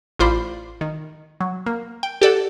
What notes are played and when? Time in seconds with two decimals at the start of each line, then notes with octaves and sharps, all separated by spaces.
0.19 A1 F4 C5 D5 B5
0.81 D#3
1.40 F#3
1.66 A#3
2.03 G5
2.22 G4 A4 D5 F#5